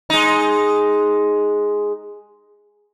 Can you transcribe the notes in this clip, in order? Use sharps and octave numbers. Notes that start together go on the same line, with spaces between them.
G#3 D#4